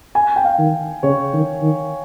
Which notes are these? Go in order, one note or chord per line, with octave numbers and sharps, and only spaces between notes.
G#5
G5
F5
D#3
C#3 C#5
D#3
D#3